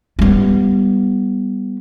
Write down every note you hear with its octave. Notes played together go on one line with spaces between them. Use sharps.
G3 B3